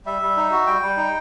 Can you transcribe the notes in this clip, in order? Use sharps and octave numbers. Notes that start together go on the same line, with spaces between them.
G3 E5
G3
D#4
F#4
G3 G5
G3
D#4